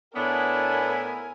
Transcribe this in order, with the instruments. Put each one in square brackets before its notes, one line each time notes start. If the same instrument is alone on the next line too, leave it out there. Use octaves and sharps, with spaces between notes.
[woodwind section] A2 E4 [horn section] B3 [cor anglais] D4 [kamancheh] A#4 G#5